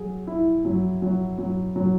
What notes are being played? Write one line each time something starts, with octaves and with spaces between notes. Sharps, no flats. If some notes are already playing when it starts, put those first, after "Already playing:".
Already playing: F#3 G#4
E4
F#3
F#3
F#3
F#3